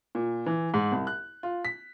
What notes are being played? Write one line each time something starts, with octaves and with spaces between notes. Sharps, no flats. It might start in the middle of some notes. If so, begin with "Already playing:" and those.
A#2
E3
G#2
C2
F#6
F4
B6